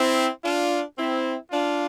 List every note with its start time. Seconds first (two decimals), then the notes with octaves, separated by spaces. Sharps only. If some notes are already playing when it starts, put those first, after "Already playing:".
Already playing: C4 E4
0.44 D4 F4
0.96 C4 E4
1.50 D4 F4